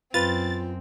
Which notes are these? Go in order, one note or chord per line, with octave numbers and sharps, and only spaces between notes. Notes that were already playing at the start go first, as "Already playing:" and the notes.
F#2 C4 F4 B4 A6